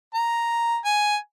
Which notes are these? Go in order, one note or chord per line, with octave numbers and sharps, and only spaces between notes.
A#5
G#5